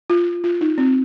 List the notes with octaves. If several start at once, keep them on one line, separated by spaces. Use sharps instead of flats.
F4
F4
D#4
C4